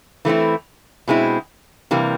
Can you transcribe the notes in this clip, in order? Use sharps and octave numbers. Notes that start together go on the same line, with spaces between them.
E3 A3 C4 E4
B2 G#3 C4 E4
C3 E3 G3 A#3